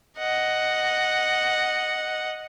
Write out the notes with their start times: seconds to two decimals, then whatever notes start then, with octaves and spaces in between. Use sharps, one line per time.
0.18 D#5 F#5